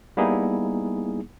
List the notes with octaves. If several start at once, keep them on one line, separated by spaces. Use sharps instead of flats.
G3 A#3 B3 D#4 E4 G#4